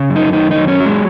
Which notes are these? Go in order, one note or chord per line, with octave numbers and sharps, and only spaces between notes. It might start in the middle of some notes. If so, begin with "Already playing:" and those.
Already playing: C#3
F#2
D#4
D#3 D#4
F#2 D#4
C#4
F#3
G#3